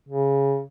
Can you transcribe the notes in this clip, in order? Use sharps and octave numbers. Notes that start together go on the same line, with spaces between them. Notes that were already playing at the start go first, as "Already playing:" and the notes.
C#3